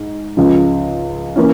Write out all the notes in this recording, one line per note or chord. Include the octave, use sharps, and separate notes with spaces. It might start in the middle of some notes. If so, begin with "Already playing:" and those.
Already playing: G#2
C#2 C#3 F3
E3 A#3 C#4